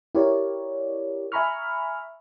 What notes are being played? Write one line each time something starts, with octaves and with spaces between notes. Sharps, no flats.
E4 G4 A#4 C#5 D5
E5 G#5 A#5 B5 C#6 F6